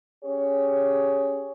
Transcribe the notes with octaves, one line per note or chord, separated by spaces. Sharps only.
C#4 G4 G#4 C#5